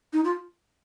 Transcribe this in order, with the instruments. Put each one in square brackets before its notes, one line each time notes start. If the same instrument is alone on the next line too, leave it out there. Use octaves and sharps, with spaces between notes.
[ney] D#4
F4